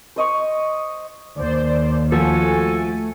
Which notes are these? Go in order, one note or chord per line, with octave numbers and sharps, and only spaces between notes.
C5 D#5 C#6
D#2 C5 D5
F3 A3 F#4 A4 G#5